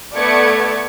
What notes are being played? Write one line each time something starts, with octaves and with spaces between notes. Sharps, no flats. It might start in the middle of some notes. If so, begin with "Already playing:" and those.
A3 B3 D5 G#6 C#7